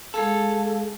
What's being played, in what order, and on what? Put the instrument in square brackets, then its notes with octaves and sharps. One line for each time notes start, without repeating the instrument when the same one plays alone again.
[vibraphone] G#3 G#4 F5 [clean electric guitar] A4